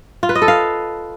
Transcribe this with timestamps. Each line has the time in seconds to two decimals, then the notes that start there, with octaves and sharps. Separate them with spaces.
0.23 F4
0.29 B4
0.35 D#5
0.42 A4
0.48 F5